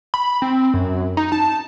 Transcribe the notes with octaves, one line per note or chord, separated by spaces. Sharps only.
B5
C4
F#2
D#4
A5